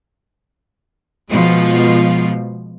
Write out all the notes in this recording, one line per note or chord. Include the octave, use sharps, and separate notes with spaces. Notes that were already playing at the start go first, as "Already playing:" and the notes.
B2 F3 G#3 F4